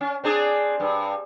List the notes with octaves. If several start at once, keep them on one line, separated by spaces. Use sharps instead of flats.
C#4
C4 D4 G#4
G2